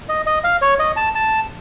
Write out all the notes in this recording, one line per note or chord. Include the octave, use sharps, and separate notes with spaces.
D#5
D#5
F5
C#5
D#5
A5
A5